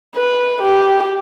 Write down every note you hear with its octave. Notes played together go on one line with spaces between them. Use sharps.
B4
G4